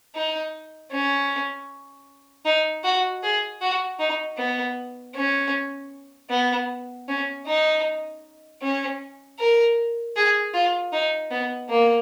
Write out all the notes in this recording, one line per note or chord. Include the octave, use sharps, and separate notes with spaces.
D#4
C#4
D#4
F#4
G#4
F#4
D#4
B3
C#4
B3
C#4
D#4
C#4
A#4
G#4
F4
D#4
B3
A#3